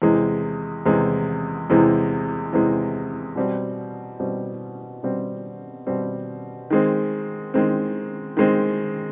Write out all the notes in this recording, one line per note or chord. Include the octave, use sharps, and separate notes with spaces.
E2 C3 E3 G#3
E2 C3 E3 G#3
E2 C3 E3 G#3
E2 C3 E3 G#3
B2 G3 C4
B2 G3 C4
B2 G3 C4
B2 G3 C4
D#3 G#3 C4
D#3 G#3 C4
D#3 G#3 C4